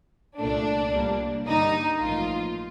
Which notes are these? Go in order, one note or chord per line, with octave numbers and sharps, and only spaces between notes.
C2 A#2 A3 D4
C2 A#2 G3 A#3
G2 D3 G3 A#3 D#4
A1 A2 F3 A#3 F4